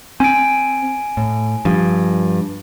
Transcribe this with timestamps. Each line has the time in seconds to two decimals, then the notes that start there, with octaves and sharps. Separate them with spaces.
0.20 C4 G#5 D7
1.17 A2
1.65 G2 F3